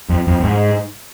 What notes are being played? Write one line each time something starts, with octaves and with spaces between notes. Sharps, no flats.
F2
F2
F2
G#2